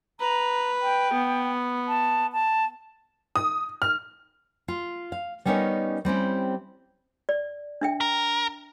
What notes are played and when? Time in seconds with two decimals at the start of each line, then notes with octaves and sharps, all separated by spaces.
0.20 B4 A#5
0.82 G5
1.13 B3
1.88 A5
2.33 A5
3.36 D#6
3.82 F6
4.68 F4
5.12 F5
5.45 G3 B3 C#4 D#4 A#4 C#5
6.05 G3 C4 C#4 E4
7.29 D5
7.81 D4 E5 G5
8.01 A#4